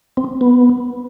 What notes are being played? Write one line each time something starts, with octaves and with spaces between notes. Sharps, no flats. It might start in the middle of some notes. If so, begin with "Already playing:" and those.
C4
B3